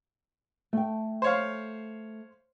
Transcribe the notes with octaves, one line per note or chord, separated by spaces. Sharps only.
A3 G5
C5 C#5 F5